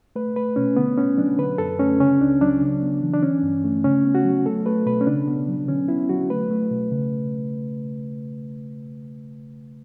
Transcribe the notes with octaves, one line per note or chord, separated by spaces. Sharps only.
A3 B4
A3 B4
B2 C#4
D3 B3
B3 C#4
F#3 D4
D3 B4
F#2 A4
A3 C#4
C#3 C#4
C#2 D4
F#3 D4
C#3
B3
E3
D4
D3 C#4
G2
A3
C#3 C#4
B3
F#4
F#3
A3 A4
A3 B4
B2 B4
C#4
C#3 D4
B3
F#3
D3 C#4
B3 E4
F#3 F#4
A3 B4
A3
B2
C#3